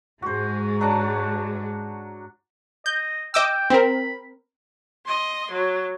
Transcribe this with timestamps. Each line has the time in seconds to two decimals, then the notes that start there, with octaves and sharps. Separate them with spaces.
0.22 G#2 G#3 F#4 C5
0.81 F#3 D4 F#5
2.86 D#5 G6
3.34 D#5 G5 D6 E6
3.70 C4 A#4 B5
5.06 D#5 C6
5.51 F#3